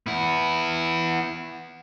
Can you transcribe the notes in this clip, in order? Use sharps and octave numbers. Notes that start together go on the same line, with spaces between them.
B3 E4